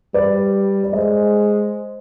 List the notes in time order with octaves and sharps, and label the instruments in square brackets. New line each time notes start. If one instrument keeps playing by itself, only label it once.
[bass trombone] G3 [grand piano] B4 D5
[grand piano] D5
[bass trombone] G#3 [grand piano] C5 D#5